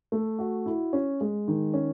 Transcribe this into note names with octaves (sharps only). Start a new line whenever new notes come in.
A3
F#4
E4
C#4
G#3
D#3
C#4